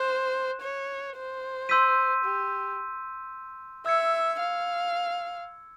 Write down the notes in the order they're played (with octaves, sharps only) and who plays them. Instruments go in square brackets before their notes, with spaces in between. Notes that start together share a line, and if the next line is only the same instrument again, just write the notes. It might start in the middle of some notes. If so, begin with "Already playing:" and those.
Already playing: [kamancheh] C5 [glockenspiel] F#6 E7
[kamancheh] C#5
C5
[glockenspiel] C6 E6 G6 B6 D#7
[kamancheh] G4
[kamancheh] E5 [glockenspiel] E6 G#6 C#7
[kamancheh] F5